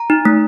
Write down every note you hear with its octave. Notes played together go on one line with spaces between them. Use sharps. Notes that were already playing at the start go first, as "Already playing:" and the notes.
Already playing: A#5
D#4
A3